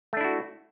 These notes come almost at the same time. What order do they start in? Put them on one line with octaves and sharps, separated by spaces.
A3 D4 E4 F#4